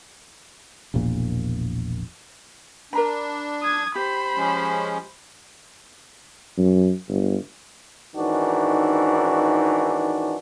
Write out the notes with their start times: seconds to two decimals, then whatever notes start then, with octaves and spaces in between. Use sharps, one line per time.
0.94 E1 A#1 A#2
2.93 D4 A#4 A#5 B5
3.62 D#6 G#6
3.96 G4 C5 B5
4.36 F3 G#3 C#4
6.58 F#2
7.09 G1
8.16 G#2 D#3 E3 C#4 D4 F#4